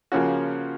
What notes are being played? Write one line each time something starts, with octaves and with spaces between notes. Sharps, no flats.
C#3 F3 A#3 C#4 F#4